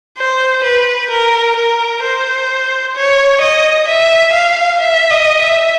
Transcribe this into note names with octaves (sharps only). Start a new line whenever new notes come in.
C5
B4
A#4
A#4
C5
C#5
D#5
E5
F5
E5
D#5
E5